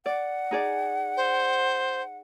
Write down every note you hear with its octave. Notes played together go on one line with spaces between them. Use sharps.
D5 F#5
D#4 G#4 D5
C5